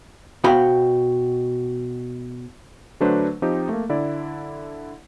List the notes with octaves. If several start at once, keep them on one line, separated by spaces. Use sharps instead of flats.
B2 F#4 C5 F5 G5 B5
D3 F#3 A3 D4 B4 C5
F3 C4 D#4 G4
A3 A#3
D3 E4 D5